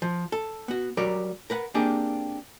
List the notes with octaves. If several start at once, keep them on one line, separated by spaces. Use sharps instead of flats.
F3
A4
B3 F#4
F#3 G3 A#4 C#5 D5
A#4 B4 F#5
A#3 C4 D4 G4 G#4 A#4